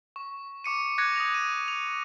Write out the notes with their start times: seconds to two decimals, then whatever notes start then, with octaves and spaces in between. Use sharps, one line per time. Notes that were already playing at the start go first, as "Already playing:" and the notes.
0.16 C#6
0.64 C#6 D6 C#7 D#7
0.98 D6 F#6 G#6 A#6 C#7
1.16 D#6 A#6 F7
1.34 D#7
1.68 F7